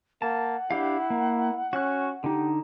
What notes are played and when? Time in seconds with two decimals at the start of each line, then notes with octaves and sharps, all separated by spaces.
0.22 A#3 F#5 A5
0.71 D4 E4 G4 F5
1.10 A#3
1.73 C#4 F#4 F#6
2.24 D3 D#4 G4